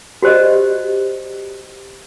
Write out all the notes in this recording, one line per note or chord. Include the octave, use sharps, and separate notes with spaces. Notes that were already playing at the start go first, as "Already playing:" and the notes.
F#4 G4 C5 D5 D#5